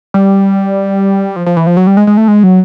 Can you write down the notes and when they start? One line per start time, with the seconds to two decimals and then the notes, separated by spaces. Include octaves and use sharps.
0.14 G3
1.36 F3
1.46 F3
1.57 E3
1.67 F3
1.77 F#3
1.87 G3
1.97 G#3
2.07 G#3
2.17 A3
2.28 G#3
2.43 F#3